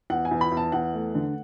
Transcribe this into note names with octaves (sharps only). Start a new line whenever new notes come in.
E2 F#5
G#5
E2
B5
E2
A5
E2 F#5
A3
D3